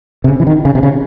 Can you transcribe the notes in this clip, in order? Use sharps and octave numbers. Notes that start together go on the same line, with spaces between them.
C3
C#3
E3
D#3
C#3
C3
C#3